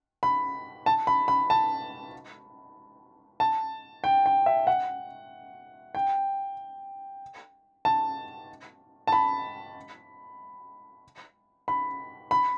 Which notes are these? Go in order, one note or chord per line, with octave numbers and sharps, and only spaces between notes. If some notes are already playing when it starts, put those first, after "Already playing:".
B5
A5
B5
B5
A5
A5
G5
G5
E5
F#5
G5
A5
A5
B5
B5
B5